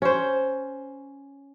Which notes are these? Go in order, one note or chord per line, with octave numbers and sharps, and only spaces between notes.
C#4 C5